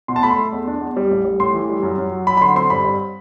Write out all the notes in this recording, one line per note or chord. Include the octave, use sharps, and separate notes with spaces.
B2 C6
A5
A3 B5
C6
A3
E2
D4
E2
G3
A1
G3
A2 C6
E3
G3
F#2
F#2
F#3
F#3 B5
B5
D3 C6
C4 C6
G2 B5
G2